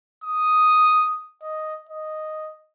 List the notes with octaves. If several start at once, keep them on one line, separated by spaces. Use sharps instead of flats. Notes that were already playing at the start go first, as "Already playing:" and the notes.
D#6
D#5
D#5